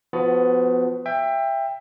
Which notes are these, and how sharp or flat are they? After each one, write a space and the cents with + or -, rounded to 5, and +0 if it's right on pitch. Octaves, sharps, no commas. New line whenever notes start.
F3 +5 B3 +25 F#4 +0
E5 +15 G5 +20